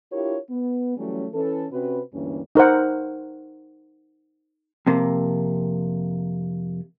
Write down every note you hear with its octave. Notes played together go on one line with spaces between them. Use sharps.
D4 E4 F4 G4 A#4 C#5
B3
E3 F#3 G3 A3 C#4
E3 C#4 A4
C3 C4 C#4 F#4 B4
D2 G2 E3 A#3 C#4
D#4 A#4 C5 F#5
F2 C3 A#3